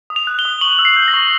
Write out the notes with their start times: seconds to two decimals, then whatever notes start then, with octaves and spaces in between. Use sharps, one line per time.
0.10 D#6
0.16 F7
0.27 F#6
0.39 G7
0.45 D#6
0.61 C#6 F#7
0.79 E6
0.85 C7
0.96 G6
1.08 A#6
1.14 C#6